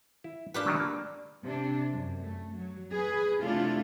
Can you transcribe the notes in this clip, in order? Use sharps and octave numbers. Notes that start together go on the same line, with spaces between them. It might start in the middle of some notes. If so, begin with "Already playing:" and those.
E4
D4 F4 G4 G#4 A#4 B4
A2 D#3 F#3
A#3
C3 D4
F#2
A3
F#3
G#4 B4
C3 A3 D4 E4 F4 A4